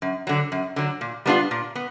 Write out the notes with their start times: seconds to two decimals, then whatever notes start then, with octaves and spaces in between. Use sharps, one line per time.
0.02 F#2
0.27 D3 F#3
0.52 F#2
0.76 D3 F#3
1.01 A#2
1.26 G3 B3 D4 F4
1.51 A#2
1.75 B3